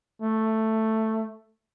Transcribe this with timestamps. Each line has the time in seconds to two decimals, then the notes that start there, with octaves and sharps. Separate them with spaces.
0.22 A3